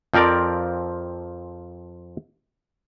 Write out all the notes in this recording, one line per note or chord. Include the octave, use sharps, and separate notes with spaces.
F2 F3 C4 A#4 D5